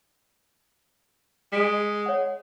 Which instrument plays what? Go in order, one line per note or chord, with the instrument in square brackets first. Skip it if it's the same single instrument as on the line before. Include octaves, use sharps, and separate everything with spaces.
[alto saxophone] G#3 [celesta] B6 D7
[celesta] C#5 F#5